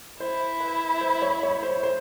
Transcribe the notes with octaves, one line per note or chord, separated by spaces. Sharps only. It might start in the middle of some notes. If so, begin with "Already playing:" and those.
E4 C5
B4
C5
C#5
C#5
C5
C5